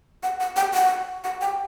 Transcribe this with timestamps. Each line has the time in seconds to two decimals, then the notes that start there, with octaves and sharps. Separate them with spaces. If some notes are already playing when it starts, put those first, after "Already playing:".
0.23 F#5
0.40 F#5
0.56 G5
0.74 F#5
1.24 F#5
1.41 G5